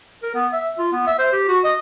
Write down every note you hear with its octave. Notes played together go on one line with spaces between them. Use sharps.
A#4
B3
E5
F4
B3
E5
C5
G4
F#4
D#5